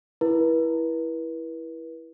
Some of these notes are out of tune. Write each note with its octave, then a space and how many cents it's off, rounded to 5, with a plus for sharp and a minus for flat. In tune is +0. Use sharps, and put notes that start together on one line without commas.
E4 +0 B4 -40